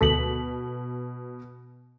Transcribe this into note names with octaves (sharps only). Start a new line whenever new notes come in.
D2 B2 A4 B6 F#7